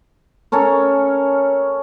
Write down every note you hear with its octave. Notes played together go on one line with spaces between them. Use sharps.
C#4 A4 A#4 C#5